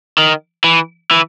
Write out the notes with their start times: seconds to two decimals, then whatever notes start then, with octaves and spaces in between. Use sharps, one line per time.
0.18 D#3
0.64 E3
1.11 E3